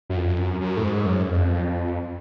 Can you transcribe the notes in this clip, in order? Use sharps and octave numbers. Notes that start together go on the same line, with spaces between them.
F#2
F2
F#2
F#2
A2
G#2
F#2
F2